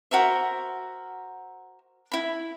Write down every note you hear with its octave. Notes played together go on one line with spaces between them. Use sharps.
F#4 A#4 C5 E5
E4 B5